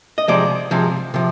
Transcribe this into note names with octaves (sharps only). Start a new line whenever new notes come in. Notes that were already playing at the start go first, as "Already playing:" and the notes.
D#5
C3 F3 G#3 D5
C3 F3 G#3
C3 F3